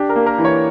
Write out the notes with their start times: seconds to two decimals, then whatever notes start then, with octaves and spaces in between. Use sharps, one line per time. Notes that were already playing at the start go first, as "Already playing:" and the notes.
Already playing: D4 G4
0.09 A#4
0.16 A#3
0.26 A#4
0.38 E3
0.45 C#5